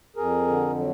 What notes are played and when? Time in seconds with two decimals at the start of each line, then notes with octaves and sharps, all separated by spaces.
0.16 F2 G#4 A#4
0.48 D3
0.78 F#3